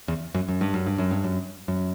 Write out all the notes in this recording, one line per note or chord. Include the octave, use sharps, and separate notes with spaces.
E2
F#2
F#2
G2
F#2
G2
F#2
G2
F#2
F#2